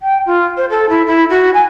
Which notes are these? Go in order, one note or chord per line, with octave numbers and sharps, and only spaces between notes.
G5
F4
C5
A4
E4
E4
F#4
G#5